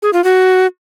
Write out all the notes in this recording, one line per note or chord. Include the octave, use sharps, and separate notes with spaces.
G#4
F4
F#4